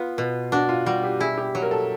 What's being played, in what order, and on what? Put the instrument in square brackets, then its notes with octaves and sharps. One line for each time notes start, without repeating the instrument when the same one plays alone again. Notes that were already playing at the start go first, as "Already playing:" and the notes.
Already playing: [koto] B3 [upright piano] F4
[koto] B2
[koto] D4 [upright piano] F#4
[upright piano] F4
[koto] G3 [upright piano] F#4
[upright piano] G4
[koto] E4 [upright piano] G#4
[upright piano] G4
[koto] F#3
[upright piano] A#4
A4